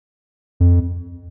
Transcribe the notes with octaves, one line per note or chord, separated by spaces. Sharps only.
F2